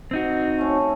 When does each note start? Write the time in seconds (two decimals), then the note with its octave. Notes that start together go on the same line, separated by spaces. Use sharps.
0.11 C4 D#4 F#4
0.58 A3 C#4